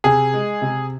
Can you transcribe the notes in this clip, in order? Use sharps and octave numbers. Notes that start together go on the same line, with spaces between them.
C3 G#4
G#3
C3